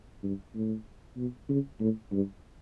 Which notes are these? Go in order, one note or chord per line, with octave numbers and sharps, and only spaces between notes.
G2
A2
B2
C#3
A2
G2